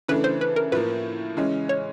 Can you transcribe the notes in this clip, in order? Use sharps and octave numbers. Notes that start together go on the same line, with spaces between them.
C#3 E3 A3 D4 B4
C5
B4
A#4
A2 F3 A#3 B4
C#3 E3 G#3 C#4
C#5